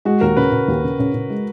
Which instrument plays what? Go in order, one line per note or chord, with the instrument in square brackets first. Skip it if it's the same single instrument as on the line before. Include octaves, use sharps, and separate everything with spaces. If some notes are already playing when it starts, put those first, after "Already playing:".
[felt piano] G#3 [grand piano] F#4
[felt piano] D#2 [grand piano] A#4
[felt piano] C#3 [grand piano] B4
[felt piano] C#3
D#2
C#3
C#3
C#3
G#3